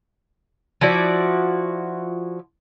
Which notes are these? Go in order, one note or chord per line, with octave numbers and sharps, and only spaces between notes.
F3 E4 F#4 D5